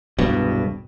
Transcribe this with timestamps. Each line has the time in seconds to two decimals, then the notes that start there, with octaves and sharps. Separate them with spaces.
0.18 E1 C2 G2 B2